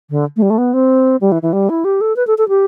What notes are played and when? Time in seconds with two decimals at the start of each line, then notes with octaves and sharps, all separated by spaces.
0.10 D3
0.36 A3
0.42 G3
0.50 A3
0.58 B3
0.73 C4
1.21 G3
1.32 E3
1.42 E3
1.53 G3
1.69 E4
1.84 G4
2.01 A4
2.16 B4
2.27 A4
2.38 A4
2.49 G4